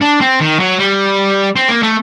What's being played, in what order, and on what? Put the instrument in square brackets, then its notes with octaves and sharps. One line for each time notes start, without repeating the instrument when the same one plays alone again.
[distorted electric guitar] D4
C4
D#3
F#3
G3
C4
A#3
A3